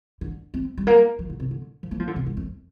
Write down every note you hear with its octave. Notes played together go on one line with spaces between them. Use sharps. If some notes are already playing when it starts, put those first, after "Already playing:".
D3
C4
G3
A#3
F3
D3
C3
D3
F3
A#3
F3
D3
C3
G2
F2